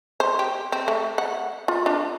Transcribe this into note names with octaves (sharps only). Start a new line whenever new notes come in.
C5
G4
C4
A3
F#5
F4
D4